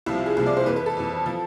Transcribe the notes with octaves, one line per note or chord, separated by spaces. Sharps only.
C2 C3 F3 E4
F4
G#4
C2 C3 F3 G#4
D5
C5
F2 E3 B4
B4
A4
F2 E3
F3